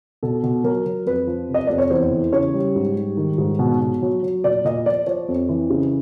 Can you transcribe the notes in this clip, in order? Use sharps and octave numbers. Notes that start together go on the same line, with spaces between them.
B2 A4
B2
F#3 A#4
F#3
F2 B4
F3
C3
D#5
F2 D5
C#5
E2 C5
E3
C#3 C#5
G3
G#2
G3
D#3
G#2
B2
B2
F#3
F#3
A#2 D5
A#2 D#5
F3 D5
F3 C#5
F2
E3
C#3